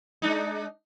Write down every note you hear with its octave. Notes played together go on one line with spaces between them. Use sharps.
G#3 D4 D#4